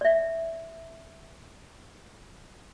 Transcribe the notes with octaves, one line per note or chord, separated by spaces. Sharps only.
D5 E5